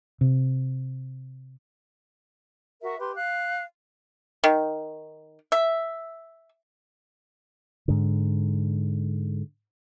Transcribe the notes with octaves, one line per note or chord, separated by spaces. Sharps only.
C3
F#4 A#4 E5
G4 B4 C6
F5 F#6
D#3
E5
G#2 D3